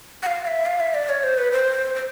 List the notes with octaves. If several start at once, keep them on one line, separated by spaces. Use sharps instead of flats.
F#5
F5
F5
E5
F5
E5
D5
C#5
C5
B4
C5
C5